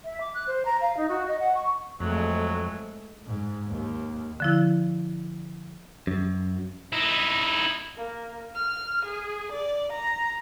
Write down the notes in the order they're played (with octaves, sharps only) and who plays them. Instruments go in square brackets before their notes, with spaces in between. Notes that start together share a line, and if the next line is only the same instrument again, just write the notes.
[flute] E5
D6
F#6
C5
A#5
F5
D#4
F#4
D#5
F#5
C#6
[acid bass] F2 [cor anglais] F#3 [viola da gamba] G#3 A3
[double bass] G#2
D#2
[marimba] D3 F3 E4
[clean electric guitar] F#2
[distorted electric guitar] D#4 E4
[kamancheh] A#3
F6
G#4
D5
A#5